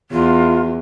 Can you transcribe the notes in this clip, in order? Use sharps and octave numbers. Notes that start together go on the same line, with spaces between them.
E2 F4